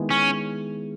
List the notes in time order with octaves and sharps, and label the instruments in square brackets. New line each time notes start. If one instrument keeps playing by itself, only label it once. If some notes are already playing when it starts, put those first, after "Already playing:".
Already playing: [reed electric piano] D#3 G#3 B3 E4 G#4
[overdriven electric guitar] C#4